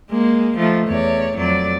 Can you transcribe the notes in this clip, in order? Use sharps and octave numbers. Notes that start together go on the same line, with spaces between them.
G#3 A#3
F3 A3 D#4
E2 C#5 D5
F2 F#3 D5